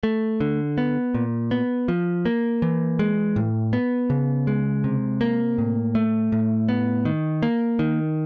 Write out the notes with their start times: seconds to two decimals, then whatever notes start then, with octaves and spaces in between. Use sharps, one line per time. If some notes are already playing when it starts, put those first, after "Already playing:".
0.03 A3
0.40 D3
0.78 B3
1.15 A#2
1.51 B3
1.88 F3
2.25 A#3
2.62 E3
2.99 G#3
3.36 A2
3.73 B3
4.10 C#3
4.47 G#3
4.84 C3
5.21 A#3
5.58 A2
5.95 A3
6.32 A2
6.69 B3
7.05 D#3
7.43 A#3
7.79 D#3